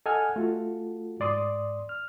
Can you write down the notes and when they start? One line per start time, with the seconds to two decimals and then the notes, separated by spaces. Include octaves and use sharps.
0.06 A4 D#5 F#5 G#5 F6
0.36 A3 F4 F#4 A4
1.20 G#2 D5 C6 D#6
1.89 F6